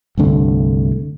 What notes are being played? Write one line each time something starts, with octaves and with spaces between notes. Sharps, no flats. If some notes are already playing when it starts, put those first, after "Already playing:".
C2 G2 D3 A3